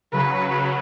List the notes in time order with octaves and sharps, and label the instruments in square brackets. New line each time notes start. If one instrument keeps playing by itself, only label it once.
[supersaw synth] C#3 F#3 [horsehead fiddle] B4